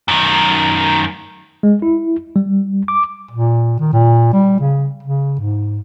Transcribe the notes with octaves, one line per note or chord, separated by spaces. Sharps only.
F#2 D#3
G#3
E4
G3
D6
A#2
D#3
A#2
G3
C#3
C#3
G#2